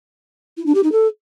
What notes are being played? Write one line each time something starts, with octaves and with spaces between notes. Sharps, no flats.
E4
D4
G4
D#4
A4